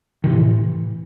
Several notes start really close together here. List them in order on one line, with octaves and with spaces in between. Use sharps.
D#3 C3 E3 A2